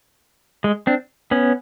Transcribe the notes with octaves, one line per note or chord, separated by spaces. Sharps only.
G#3
C4 D4
B3 C#4